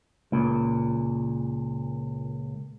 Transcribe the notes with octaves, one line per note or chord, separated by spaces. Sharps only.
C#2 A#2